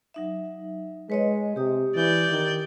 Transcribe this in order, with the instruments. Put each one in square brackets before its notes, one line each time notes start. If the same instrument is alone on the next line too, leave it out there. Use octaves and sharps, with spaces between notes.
[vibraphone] F#3 D#4 E5
[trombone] G#3 [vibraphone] B4 C#5 D#5
[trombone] C3 [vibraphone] G4 D#6
[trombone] E3 [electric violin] D5 G6
[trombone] D#3